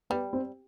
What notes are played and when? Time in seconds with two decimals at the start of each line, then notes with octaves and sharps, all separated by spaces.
0.10 G3 B3 B4
0.33 C4 C5